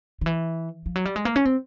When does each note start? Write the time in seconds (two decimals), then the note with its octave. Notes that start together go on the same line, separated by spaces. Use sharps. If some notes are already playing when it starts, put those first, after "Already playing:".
0.21 D#3
0.26 E3
0.86 F3
0.95 F#3
1.05 G3
1.16 G#3
1.25 A#3
1.36 C#4
1.45 C4